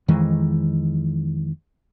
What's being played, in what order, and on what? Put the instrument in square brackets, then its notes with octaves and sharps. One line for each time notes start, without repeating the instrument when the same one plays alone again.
[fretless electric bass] F2 D#3 E3 G#3